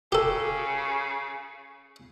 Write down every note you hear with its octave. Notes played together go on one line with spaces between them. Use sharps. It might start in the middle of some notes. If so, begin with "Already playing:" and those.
C#3 G4 A4